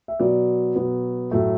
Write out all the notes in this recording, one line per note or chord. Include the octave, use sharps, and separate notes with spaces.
E5
B2 F#3 B3 D5
B2 F#3 B3
A2 F#3 A3